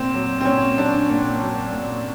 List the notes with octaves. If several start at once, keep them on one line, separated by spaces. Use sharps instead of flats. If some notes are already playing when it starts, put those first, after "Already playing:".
Already playing: A#2 C4
F#3
C4
A#2 C#4
F#3 D4
A#2
F#3
A#2